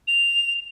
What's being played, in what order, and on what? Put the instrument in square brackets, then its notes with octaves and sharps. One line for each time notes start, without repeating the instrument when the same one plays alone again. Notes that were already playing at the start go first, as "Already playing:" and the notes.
[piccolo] F7